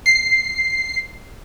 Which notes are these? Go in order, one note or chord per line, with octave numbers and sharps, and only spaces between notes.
C7